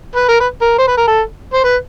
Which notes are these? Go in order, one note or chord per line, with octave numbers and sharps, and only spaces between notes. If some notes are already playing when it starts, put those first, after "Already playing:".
B4
A#4
B4
A#4
C5
B4
A#4
A4
C5
B4